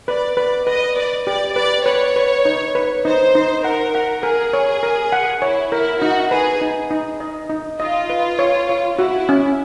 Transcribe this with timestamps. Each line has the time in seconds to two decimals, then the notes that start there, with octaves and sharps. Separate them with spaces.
0.08 B4 D5
0.37 B4 D5
0.67 B4 D#5
0.97 B4 D5
1.27 G4 D5
1.56 B4 D5
1.86 B4 C#5
2.16 B4
2.45 D#4
2.75 B4
3.05 D#4 C5
3.35 D#4
3.64 A#4 F#5
3.94 F#5
4.23 G#4 A#4
4.53 C#5
4.83 A#4
5.12 F#5
5.42 E4 C#5
5.72 E4 A#4
6.02 D#4 F#4
6.31 G#4 B4
6.61 D#4
6.91 D#4
7.20 D#5
7.50 D#4
7.80 F4 D#5
8.10 B4
8.39 C#5
8.69 C#5
8.99 E4 F#4
9.29 C#4